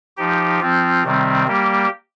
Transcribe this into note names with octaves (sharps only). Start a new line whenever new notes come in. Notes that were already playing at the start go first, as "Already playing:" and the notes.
F3 D#4 G4
F3 C4 F4
C3 D#3 G3 C4
G3 A#3 G4